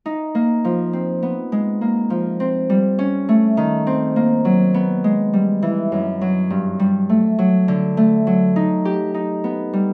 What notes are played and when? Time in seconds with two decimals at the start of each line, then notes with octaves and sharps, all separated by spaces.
0.06 D#4
0.35 A#3
0.65 F3
0.93 C4
1.23 B3
1.52 G#3
1.81 A#3
2.10 F3
2.40 C4
2.70 G3
2.99 C#4
3.29 A3
3.57 D#3
3.87 C4
4.16 A#3
4.45 F#3
4.74 B3
5.04 G#3
5.33 G3
5.63 E3
5.92 F#2
6.21 F#3
6.50 G2
6.80 G3
7.09 A3
7.39 F#3
7.68 D3
7.97 A3
8.27 F#3
8.56 D#4
8.85 G4
9.14 D#4
9.44 B3
9.73 G3